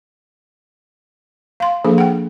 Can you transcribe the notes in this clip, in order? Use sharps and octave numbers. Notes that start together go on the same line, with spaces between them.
F5 C6
F3 A#3 D4 G#4 A4
F#5 G5